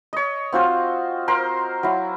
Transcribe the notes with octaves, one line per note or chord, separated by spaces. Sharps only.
C#5 D#5
C4 F4 F#4 C5
A#4 C5 A#5 C6
F#3 E4